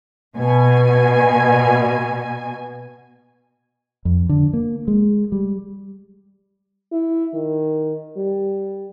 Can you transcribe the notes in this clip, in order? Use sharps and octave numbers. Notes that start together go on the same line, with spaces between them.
B2 G#5
F2
D3
A#3
G#3
G3
E4
D#3
G3